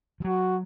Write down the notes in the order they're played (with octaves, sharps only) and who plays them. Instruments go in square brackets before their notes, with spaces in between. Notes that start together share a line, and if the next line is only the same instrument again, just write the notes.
[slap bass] F3
[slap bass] F#3 [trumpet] F#4